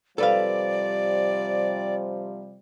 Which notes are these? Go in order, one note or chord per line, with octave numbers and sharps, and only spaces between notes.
C3 F3 G3 A4 B4 D5 F5